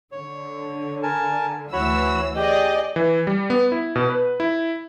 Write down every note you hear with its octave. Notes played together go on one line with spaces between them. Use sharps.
D3 C#5
A#4 G#5 A5
D2 E3 F#4 C#5 B5 E6
G4 G#4 D5 D#5
E3
G3
B3
E4
B2
B4
E4